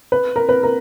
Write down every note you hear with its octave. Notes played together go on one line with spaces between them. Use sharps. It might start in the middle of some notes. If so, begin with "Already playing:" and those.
B4
A#4
B4
A#4